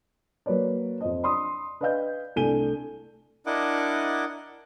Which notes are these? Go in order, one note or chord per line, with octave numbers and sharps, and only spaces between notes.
F#3 A#3 B4 C#5 D5
F2 C5 D#5
D5 B5 C6 D#6
B4 D5 D#5 F5 G5 G6
C2 A3 D4 G#5 D#7 G7
D4 E4 A#4 D#5 F#5 D6